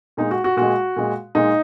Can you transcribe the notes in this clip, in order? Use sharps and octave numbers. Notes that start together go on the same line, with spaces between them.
A#2 G#3 D#4
F#4
F#4
A#2 G#3 F#4
A#2 G#3
A#2 G#3 D#4